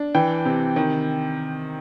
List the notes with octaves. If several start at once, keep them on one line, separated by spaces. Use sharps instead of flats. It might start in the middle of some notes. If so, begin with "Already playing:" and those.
Already playing: D4
E3 G5
C3
D#3